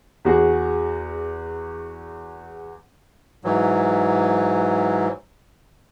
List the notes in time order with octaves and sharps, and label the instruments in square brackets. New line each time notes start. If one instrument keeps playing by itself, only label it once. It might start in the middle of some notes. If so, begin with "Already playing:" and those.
[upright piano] E2 F#4 G#4
[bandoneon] G#2 E3 F#3